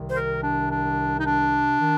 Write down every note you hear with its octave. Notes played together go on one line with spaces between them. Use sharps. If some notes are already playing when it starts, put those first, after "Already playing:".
Already playing: C2 C3 D#3
C5
A#4
D4
D4
D#4
D4
D#3